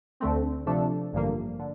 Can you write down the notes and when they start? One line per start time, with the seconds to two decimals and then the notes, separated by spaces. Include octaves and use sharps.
0.20 D2 D3 A3 C4
0.66 C3 F3 A3 D4 A4
1.12 A1 G2 D3 F3 A#3
1.59 D3